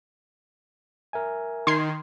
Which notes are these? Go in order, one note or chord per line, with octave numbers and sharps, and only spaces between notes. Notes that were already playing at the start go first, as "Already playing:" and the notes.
A#4 E5 G#5
D#3 D#4 C6 G#6 C7